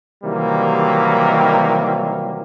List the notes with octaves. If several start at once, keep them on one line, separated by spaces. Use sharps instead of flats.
C3 D#3 E3 F#3 G3 A#3